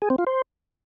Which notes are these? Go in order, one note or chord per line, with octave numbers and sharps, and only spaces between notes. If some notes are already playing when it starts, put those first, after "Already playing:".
G#4
C4
F4
C5